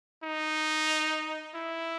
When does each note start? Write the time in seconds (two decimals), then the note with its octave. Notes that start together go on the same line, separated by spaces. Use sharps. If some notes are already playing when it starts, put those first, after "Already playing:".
0.24 D#4
1.55 E4